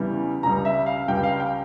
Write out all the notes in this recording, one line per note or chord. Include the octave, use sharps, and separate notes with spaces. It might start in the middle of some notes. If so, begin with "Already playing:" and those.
Already playing: E2 C#3 E3 G3
C#2 C#3 G3 A#5
E5
F5
C#2 C#3 G3 G5
F5
G5